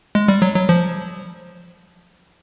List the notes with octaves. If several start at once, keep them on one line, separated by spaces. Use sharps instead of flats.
G#3
G3
F#3
F#3
F3